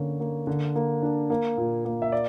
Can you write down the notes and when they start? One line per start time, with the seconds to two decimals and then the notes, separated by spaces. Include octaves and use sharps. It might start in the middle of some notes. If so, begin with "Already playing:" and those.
Already playing: D3 A#3 C#4
0.20 A#3
0.47 D3
0.75 A#3
1.02 D4
1.30 A#3
1.57 A#2
1.85 A#3
2.02 E5
2.12 D5